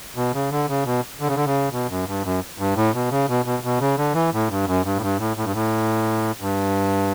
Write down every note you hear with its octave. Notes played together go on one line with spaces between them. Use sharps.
B2
C#3
D3
C#3
B2
D3
C#3
D3
C#3
B2
F#2
G2
F#2
G2
A2
B2
C#3
B2
B2
B2
C#3
D3
E3
A2
G2
F#2
G2
A2
G2
A2
A2
G2
A2
G2